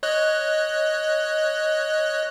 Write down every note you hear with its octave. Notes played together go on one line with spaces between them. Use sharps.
C#5 D#5 F#6